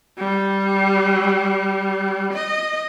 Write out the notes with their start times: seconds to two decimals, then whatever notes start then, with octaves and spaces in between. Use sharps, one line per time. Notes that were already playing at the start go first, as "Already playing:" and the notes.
0.18 G3
2.33 D#5